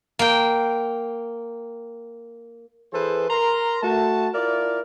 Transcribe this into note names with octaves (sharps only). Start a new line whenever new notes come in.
A#3 G5
E3 G#4 A4 B4 C5
A#4 A#5 C6
A3 F#4 A5
E4 F4 A#4 D5